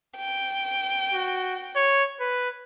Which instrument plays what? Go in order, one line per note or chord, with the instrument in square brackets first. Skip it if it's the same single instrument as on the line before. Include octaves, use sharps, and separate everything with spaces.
[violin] G5
[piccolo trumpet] F#4
C#5
B4